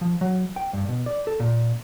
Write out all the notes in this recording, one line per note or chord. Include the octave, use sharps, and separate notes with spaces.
F3
F#3
G5
G2
B2
D5
A4
A#2